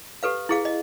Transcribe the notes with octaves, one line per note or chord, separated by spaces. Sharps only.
G4 A4 B4 F5
E4 G#4 F5
D#5